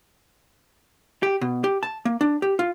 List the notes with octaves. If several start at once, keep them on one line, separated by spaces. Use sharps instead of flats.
G4
B2
G4
A5
A#3
D4
G4
F4